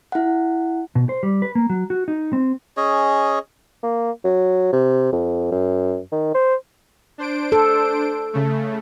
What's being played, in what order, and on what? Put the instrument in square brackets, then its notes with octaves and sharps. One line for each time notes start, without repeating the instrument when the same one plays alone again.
[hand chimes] E4 F#5
[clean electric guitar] B2
C5
G3
B4
A#3
F#3
F#4
D#4
C4
[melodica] C#4 G#4 C#5 D#5
[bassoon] A#3
F#3
C3
F2
F#2
D#3
C5
[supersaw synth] D4 C5 D7
[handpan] A4
[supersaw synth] C#3 A3